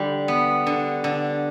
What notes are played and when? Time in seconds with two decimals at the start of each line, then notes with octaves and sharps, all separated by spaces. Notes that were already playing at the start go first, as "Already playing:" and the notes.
Already playing: D3 G3
0.28 B3
0.67 D3
1.04 D3